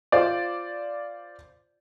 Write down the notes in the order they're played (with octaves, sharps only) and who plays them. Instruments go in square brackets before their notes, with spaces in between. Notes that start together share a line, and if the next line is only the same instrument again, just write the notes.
[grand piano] F4 C5 D5